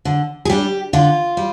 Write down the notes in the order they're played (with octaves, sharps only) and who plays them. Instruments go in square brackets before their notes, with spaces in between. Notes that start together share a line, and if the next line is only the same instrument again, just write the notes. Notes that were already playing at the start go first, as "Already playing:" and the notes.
[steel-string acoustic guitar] D3
G#4
G3 D4 G4
D3 F4
G3